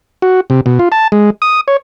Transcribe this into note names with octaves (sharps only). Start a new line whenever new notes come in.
F#4
C3
B2
F4
A5
G#3
D#6
C#5